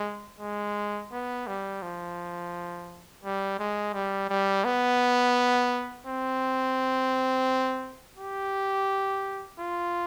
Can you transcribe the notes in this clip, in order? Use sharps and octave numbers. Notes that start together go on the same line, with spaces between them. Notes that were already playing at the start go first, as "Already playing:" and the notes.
Already playing: G#3
G#3
B3
G3
F3
G3
G#3
G3
G3
B3
C4
G4
F4